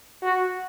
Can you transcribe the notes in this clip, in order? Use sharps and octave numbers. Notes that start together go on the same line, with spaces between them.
F#4